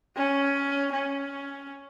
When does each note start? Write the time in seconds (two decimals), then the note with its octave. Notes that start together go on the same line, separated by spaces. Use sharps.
0.16 C#4
0.92 C#4